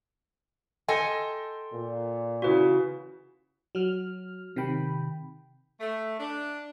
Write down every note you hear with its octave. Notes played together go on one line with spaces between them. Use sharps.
A4 D#5 G5 G#5 C6
A#2
C#3 E3 F4 F#4 B4
F#3 F6
C3 D#3 G5 B5
A3
D4